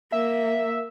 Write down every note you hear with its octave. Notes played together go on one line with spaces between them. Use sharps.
A#3 E5